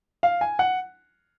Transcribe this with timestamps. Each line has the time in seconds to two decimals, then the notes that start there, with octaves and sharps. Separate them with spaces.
0.23 F5
0.41 G#5
0.59 F#5